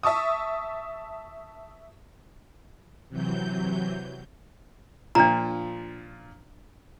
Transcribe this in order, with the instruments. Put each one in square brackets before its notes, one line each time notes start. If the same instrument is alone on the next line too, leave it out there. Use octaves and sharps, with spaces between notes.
[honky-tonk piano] E5 A5 C#6 D#6
[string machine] C3 E3 F#3 G6
[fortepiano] A#2 F3 [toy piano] D4 A#5